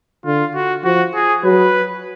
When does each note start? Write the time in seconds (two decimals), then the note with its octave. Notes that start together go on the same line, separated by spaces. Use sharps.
0.25 D3 F4
0.55 F#4
0.84 F3 F#4
1.15 G#4
1.44 F#3 B4